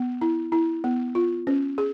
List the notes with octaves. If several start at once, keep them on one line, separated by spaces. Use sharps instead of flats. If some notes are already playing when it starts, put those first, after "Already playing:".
Already playing: B3
E4
E4
B3
F4
C#4
G#4